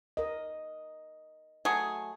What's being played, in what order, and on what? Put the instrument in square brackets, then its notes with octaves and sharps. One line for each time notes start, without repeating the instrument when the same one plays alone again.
[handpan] A#4 D#5
[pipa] F#3 A3 G#4